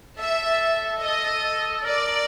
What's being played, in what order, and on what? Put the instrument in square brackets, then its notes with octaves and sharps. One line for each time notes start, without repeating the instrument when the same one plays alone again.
[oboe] A4 [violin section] E5
[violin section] D#5
[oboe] A#4 [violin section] D5